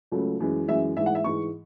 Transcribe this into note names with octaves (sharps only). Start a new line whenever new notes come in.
C#2 C#3 F#3 A3
F#2 E3 G#3
F#2 E3 G#3 E5
G#2 E3 G#3 E5
F#5
E5
G#2 E3 G#3 C#6